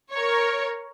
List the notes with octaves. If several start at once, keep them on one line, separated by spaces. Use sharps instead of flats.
A#4 C#5